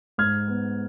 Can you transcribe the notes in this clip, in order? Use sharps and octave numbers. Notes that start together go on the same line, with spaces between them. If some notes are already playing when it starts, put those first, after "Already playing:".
G#2 F6 G#6
B3